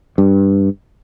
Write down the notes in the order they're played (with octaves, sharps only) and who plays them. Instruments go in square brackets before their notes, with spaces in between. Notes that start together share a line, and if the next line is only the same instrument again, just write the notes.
[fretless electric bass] G2